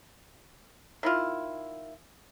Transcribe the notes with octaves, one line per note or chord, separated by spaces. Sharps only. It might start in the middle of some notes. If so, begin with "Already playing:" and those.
D#3 E4 F4